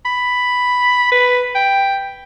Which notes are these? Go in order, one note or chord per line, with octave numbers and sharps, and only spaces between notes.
B5
B4
G5